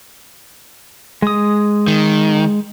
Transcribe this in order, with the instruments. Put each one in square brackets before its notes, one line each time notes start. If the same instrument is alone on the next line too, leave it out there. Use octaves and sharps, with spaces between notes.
[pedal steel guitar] G#3 D#6
[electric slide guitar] D#3